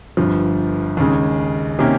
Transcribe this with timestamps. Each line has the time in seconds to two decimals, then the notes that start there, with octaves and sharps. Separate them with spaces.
0.17 G1 G2 F3
0.97 D#2 C#3 G#3
1.79 C3 D#3 A#3 C#4 G4